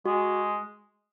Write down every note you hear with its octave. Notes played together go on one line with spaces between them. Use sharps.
G#3 F#4